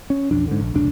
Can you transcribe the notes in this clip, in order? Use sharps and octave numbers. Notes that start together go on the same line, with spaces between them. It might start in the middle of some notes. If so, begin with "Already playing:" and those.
C#4
B1 F2 D4
G#2 D3
A#1
F1 C#2 D4